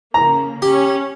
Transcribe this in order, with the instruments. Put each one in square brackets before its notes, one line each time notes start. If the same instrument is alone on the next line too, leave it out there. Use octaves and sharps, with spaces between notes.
[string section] C#3 A#3 [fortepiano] A#5
[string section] C#4 [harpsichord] G4